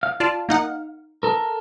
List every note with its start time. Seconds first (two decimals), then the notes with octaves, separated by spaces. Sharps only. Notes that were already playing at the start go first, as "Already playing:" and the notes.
0.03 F5
0.20 F4 D5 A5
0.49 A#3 D#4 F#5
1.23 A4 A#4